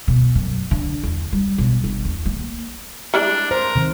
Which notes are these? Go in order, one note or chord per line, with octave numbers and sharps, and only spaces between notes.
B2
F#2
D3
E2
G3
B1
G1
E2
A#3
G3 G#3 D4 E4
A#4 C5
C3 D#3